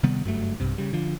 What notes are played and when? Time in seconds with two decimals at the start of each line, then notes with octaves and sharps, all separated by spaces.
0.03 C3 D#3 G3 B3
0.24 F#1 G2 F#3 A3
0.60 B1 G2 C3
0.78 C#3 G3
0.93 D3 F3